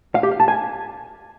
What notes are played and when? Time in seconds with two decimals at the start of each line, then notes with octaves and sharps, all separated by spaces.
0.15 F5
0.23 G4
0.31 F5
0.40 A5
0.48 G#5